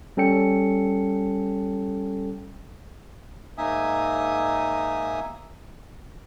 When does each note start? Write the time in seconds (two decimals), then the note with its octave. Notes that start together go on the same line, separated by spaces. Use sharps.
0.17 G3 C#4 A4 G5 C#7
3.58 G#2 A#3 D#4 E5 G#5 D#6